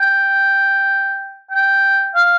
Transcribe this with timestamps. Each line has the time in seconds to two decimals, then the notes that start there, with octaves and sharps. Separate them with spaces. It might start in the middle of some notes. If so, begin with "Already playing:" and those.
Already playing: G5
1.51 G5
2.14 F5